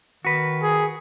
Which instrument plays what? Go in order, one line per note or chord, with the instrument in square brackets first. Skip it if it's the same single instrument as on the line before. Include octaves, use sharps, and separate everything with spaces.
[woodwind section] D#3 [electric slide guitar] F#4 B4
[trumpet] G#4